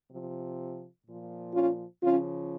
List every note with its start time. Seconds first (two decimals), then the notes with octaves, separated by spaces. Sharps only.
0.09 C3 F3
1.05 A#2 F3
1.53 C#4 F4
2.01 C#3 F3 C#4 F4